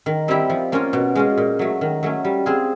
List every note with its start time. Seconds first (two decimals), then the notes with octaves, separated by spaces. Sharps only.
0.06 D#3
0.28 G3 C4 E4 G4
0.50 F3
0.72 A#3 C#4 F4
0.93 B2
1.15 G#3 C#4 F4
1.37 A#2
1.59 F#3 A3
1.81 D#3
2.03 F#3 A3 C#4
2.24 G3
2.46 C4 F4 G#4